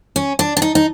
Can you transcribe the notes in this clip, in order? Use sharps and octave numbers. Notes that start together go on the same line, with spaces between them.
C#4
D4
D4
D#4
D#4